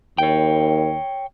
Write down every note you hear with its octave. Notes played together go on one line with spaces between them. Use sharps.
D#2 C#5 G5